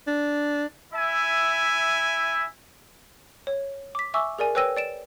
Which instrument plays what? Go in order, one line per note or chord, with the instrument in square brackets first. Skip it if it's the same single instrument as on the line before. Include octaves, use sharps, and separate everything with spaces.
[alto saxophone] D4
[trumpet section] E4 E5 G#5
[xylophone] C#5
D6 B6
E5 G#5 C#6 D6 E6
G#4 A#4 D5 G#5
B4 C#5 G5 E6 A#6 D#7
D5 D7 E7